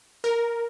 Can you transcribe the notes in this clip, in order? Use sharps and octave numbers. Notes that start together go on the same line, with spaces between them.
A#4